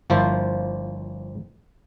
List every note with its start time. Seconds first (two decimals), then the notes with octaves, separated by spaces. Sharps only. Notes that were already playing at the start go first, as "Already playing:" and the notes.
0.10 G1 F3 A#3 E4 C5